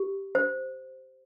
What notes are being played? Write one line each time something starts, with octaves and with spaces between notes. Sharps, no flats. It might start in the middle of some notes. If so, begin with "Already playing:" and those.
Already playing: G4
C5